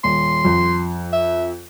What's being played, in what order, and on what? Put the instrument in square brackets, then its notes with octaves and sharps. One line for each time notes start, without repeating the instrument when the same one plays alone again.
[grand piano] D#1 [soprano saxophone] C6
[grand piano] F2
[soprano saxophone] E5